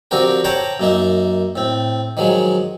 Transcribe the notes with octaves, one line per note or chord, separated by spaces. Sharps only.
D3 F3 C4 F#4 G4 A#4
C5 C#5 F#5 G5 A5 A#5
F#2 A#3 D#4 E5
A2 C4
D#3 F3 F#3 G#3